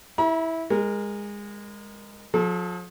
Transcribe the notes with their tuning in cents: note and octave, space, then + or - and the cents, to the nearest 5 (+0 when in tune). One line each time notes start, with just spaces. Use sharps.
E4 -15 B5 -45
G#3 -20 A#4 +0
F3 +40 A4 -35